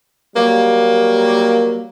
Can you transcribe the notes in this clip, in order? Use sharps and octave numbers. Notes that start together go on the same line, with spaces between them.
F#3 G3 A#3